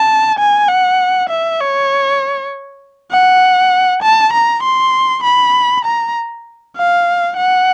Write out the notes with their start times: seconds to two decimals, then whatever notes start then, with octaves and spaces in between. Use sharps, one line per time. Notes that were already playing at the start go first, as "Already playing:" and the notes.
Already playing: A5
0.39 G#5
0.68 F#5
1.29 E5
1.60 C#5
3.11 F#5
4.03 A5
4.33 A#5
4.63 C6
5.24 B5
5.85 A#5
6.76 F5
7.37 F#5